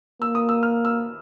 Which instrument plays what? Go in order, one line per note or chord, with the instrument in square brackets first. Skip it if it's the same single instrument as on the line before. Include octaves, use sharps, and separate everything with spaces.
[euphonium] A#3 [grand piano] E6
[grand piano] D#6
E6
F6
E6